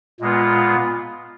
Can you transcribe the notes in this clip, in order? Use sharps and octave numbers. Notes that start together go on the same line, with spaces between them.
A#2 G#3 B3 F4